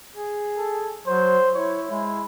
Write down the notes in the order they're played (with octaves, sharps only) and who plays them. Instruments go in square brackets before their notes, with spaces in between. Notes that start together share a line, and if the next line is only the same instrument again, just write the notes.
[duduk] G#4
[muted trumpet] A4
[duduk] F#3 [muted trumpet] C5
[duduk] E4 [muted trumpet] C#5
[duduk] G#3 [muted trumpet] E4